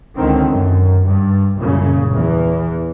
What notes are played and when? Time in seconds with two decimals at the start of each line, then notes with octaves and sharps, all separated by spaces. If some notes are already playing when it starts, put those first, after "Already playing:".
0.15 C#2 D3 D#3 C4
0.49 F#2
1.04 G2
1.56 C2 F#2 A#2 C#3
2.11 E2 E3